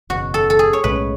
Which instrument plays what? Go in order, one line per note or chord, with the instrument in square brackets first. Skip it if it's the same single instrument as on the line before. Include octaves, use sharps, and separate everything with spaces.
[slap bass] F#1 E2 B2 [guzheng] F#4
[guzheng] A4
A4
G#4
C#5
[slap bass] B1 A2 G#3 C#4 [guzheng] B4